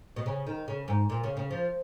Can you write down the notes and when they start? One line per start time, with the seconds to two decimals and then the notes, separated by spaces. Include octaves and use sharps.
0.16 B2
0.26 C#3
0.47 D#3
0.68 C#3
0.88 G#2
1.10 A#2
1.24 C#3
1.37 C#3
1.51 F3